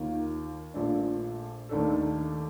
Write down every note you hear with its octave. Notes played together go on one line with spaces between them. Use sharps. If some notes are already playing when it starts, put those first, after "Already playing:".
Already playing: D#2 D#3 A#3 F4
A#1 A#2 A3 D4
D#2 D#3 A3 D4 A4